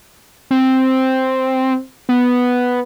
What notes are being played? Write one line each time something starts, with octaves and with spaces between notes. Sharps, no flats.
C4
B3